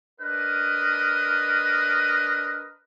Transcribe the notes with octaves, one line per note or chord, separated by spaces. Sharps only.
D4 A#4 B4 D#5